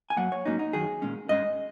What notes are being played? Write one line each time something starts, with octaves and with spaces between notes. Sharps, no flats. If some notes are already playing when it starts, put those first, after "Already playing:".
G#5
F#2 F#3 A#3 F#5
C#5
G#2 F#3 A#3 C#4 D#4
D#4
F#2 D#3 F#3 G#4
A#2 G#3 C#4
G#2 G#3 C#4 D#5